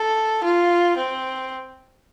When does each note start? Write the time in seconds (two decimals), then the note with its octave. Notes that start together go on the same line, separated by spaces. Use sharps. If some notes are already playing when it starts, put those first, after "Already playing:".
Already playing: A4
0.43 F4
0.97 C4